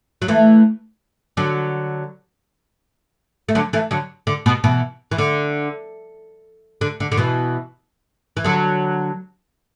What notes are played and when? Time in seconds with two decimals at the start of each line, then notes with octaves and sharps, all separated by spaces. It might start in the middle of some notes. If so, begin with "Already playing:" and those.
0.22 F#3
0.28 E3 A3
1.37 D3 F#3
3.49 A3
3.55 D3 F#3
3.73 E3 A3
3.91 D3 F#3
4.27 D3
4.46 B2
4.64 B2 E3
5.11 E3
5.18 D3
6.81 D3
7.00 D3
7.12 D3
7.17 B2 E3
8.37 E3
8.44 D3 F#3